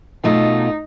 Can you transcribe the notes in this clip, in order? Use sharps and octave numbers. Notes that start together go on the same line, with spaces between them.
B2 A3 D#4 F4